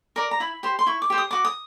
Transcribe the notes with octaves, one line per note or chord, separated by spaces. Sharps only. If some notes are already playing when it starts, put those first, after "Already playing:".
A#4 D5 A#5
A#5
E4 B5
G4 C5
C6
E4 C#6
D6
G4 C5
D#6
F#4 D6
D#6